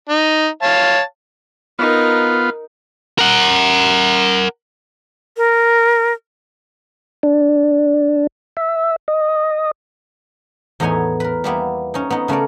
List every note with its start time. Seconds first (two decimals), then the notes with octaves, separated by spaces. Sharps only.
0.09 D#4
0.63 C#5 F5 A5
1.79 B3 D#4 F4 A#4
3.18 A#4 F#5
5.36 A#4
7.23 D4
8.57 E5
9.08 D#5
10.80 E2 A2 B3 D#4 C#5 G#5
11.20 A#4 B4
11.44 G3 A#3 B3 E4
11.94 C#4 D#4
12.10 B3 D#4
12.28 C#3 A3 C#4 A#4 D5